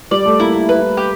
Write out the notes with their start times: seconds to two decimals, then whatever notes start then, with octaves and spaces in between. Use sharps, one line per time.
0.11 G3 D5
0.26 A3
0.40 A#3 E4
0.54 A#3
0.69 B4
0.97 G4